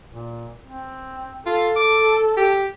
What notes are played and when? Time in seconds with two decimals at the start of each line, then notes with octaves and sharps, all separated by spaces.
0.12 A#2
0.67 C4
1.46 F4 A4
1.76 D6
2.37 G4